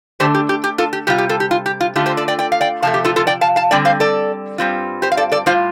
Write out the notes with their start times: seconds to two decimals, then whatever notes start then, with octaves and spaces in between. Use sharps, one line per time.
0.20 D3 A3 D4 G4 C5
0.35 G4
0.49 G4
0.64 G4
0.78 F4 A4
0.93 G4
1.07 C3 G3 F4 G4
1.18 G4
1.29 F4 A4
1.40 G4
1.51 F4
1.66 G4
1.81 F4
1.96 D3 A3 F4 G4
2.06 G4 C5
2.17 A4 D5
2.28 D5 G5
2.39 D5 G5
2.52 F5
2.61 D5 G5
2.82 C3 F3 A3 F5 A5
2.94 G4
3.04 F4 A4
3.16 F4 A4
3.27 D5 G5
3.41 F5 A5
3.56 F5 A5
3.71 D3 G3 C4 D5 G5
3.85 C5 F5
4.00 A4 D5
4.58 G2 G3 C4 F4
5.02 G4 C5
5.12 F5
5.17 A4 D5
5.32 A4 D5
5.46 A2 G3 F4 C5 F5